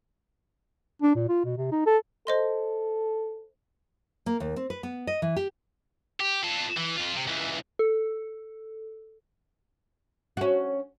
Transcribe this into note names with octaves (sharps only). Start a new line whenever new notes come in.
D4
A#2
F4
B2
C3
D#4
A4
A4 C5 D#5 C6
A#3
D#2
C4
B4
B3
D#5
E3
G4
G4
F4 A4
E3
F2 F4
C3
C#2 E3
A4
C#4 F#4